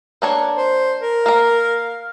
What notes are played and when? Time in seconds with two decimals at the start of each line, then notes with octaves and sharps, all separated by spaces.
0.22 A#3 D4 C#5
0.55 C5
1.00 A#4
1.26 A#3 F5 A#5